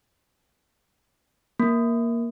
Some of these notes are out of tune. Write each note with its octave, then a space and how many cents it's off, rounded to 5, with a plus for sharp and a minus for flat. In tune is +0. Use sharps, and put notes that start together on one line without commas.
A#3 +5